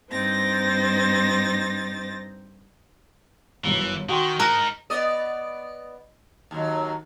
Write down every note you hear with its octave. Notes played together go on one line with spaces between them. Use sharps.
G2 C4 D#4 C5 A6 A#6
G1 F#2 E3
D#3 F#4 G5 C6
G#3 D#4 A#4 F#6
B3 D5 D#5
D#2 F#3